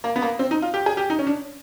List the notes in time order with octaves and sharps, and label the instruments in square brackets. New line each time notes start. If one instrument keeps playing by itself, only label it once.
[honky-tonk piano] A#3
B3
A#3
C4
D#4
F4
G4
G#4
G4
D#4
C#4
D4